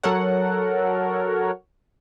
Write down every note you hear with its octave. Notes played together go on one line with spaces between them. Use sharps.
F#3 A4 A#4 C#5 F#5